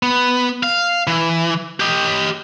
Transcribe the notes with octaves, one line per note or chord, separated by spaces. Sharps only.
B3
F5
E3
G4 D#5